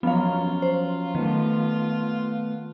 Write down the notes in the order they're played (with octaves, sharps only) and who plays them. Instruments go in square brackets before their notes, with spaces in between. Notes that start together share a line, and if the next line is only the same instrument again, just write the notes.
[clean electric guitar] F3 F#3 C#4 [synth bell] B3 F5 [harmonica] F4
[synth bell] C5
[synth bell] D#3 [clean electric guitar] A3 B3